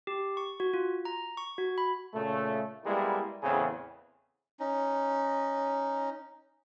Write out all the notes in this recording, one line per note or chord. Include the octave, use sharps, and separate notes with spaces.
G4
C#6
F#4
F4
A#5
C#6
F#4
B5
A#2 C#3 A3
G3 G#3 A#3 B3 E4
E2 A2 C#3 C4 G#4
C#4 D#4